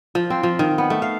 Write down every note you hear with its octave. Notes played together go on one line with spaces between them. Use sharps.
F3
C4
F3
D#3
B3
A3
F5